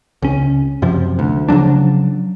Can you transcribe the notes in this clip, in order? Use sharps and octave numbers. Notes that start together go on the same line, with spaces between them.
C#2 C#4
F#2 C3 F3
D2
C#3 F3 F#3 D4